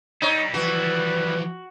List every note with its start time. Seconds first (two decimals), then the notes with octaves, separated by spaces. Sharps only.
0.22 G3 D#4 E4 C#5
0.54 E3 F3 F#4 B4